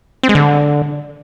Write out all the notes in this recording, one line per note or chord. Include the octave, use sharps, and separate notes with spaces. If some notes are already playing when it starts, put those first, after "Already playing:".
C4
G#3
D3